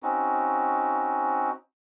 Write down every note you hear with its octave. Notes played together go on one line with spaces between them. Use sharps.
C4 C#4 D#4 F#4